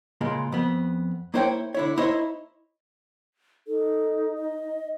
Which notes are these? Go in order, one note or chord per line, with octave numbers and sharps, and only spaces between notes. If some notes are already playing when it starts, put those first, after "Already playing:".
C#2 A#2 G#3
F2 B3
A#3 E4 C5 C#5 F5 G5
D3 E4 C#5
D#4 E4 C5 C#5 D#5 E5
D#4 A4
D#5